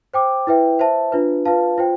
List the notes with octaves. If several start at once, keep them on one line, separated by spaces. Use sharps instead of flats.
C5 G5 D6
E4 B4 E5 G5
C5 E5 A5
D4 F4 B4
F4 B4 F5 A5
F4 C5 G5